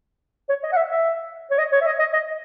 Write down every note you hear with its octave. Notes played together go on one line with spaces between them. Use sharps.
C#5
D#5
F#5
E5
E5
C#5
D#5
C#5
E5
D#5
D#5
D#5